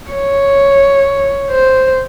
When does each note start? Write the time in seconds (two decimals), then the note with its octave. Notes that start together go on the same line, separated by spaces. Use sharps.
0.11 C#5
1.50 C5